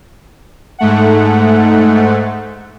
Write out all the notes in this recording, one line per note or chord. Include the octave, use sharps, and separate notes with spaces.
G#2 A3 F#5